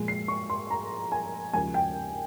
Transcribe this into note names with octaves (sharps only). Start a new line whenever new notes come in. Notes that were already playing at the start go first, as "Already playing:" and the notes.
Already playing: A#2 F3 G#3
C7
C#6
C6
A#5
G#5
D#2 C#3 F3 G#3 G#5
G5